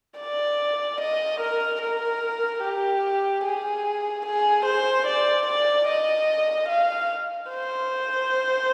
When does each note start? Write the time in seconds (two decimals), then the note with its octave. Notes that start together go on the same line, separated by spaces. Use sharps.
0.19 D5
1.01 D#5
1.41 A#4
1.81 A#4
2.63 G4
3.44 G#4
4.26 G#4
4.65 C5
5.07 D5
5.47 D5
5.88 D#5
6.69 F5
7.51 C5